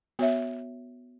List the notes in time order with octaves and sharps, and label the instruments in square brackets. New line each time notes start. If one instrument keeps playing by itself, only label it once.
[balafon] B3 F#4 C#5 E5